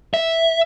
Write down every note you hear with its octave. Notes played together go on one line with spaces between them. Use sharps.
E5